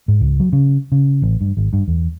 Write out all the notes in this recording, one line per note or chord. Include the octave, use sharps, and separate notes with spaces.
G#2
C#2
F#3
C#3
C#3
A1
G2
G#1
G2
E2